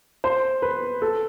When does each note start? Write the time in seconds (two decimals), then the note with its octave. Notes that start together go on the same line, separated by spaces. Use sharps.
0.24 C5
0.62 B4
1.02 A4